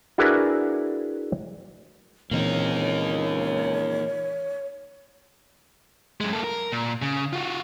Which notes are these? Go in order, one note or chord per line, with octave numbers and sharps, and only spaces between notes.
D4 E4 F#4 G#4 A#4 B4
C#2 A#2 E3 A#3 C4 D#4 C#5
F#2 G#3
A#3 A4
A#4
A#2
C#3
F4 F#4